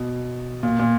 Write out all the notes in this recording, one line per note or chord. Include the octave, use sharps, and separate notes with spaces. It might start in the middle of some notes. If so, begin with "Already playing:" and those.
Already playing: B2
A#2
A#2